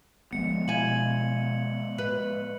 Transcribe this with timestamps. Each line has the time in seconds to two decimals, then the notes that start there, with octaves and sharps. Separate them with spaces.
0.33 F3 G#3 B3 C#7
0.68 B2 E4 F5 G#5 G#6 F#7
1.98 A2 B4